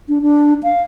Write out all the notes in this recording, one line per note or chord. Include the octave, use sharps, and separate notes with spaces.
D4
D4
F5